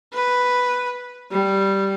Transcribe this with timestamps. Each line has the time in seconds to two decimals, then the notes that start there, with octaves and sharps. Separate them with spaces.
0.13 B4
1.31 G3